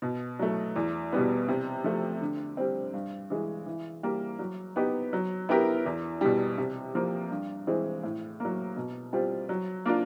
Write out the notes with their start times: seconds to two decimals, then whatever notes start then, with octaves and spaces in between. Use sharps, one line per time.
0.02 B2
0.39 F#3 A3
0.76 E2
1.12 B2 G3 B3
1.48 C3
1.84 F3 A3
2.21 D3
2.57 G3 C4
2.94 G2
3.30 E3 G#3
3.66 E3
4.03 G3 A#3
4.39 F#3
4.76 B3 D#4 G4
5.13 F#3
5.49 B3 E4 G4 A#4
5.86 E2
6.21 B2 G3
6.58 C3
6.95 F3 A#3
7.31 G2
7.67 E3 G#3 C4
8.04 A2
8.40 F#3 A#3
8.76 B2
9.13 G3 C4 F4
9.49 F#3
9.86 A#3 D4 F4